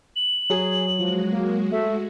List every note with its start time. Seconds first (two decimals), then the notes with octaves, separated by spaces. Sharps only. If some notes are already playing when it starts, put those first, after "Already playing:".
0.16 F#7
0.50 F#3 G#4
0.98 F3 G#3 F#4
1.31 A#3
1.72 A3 E5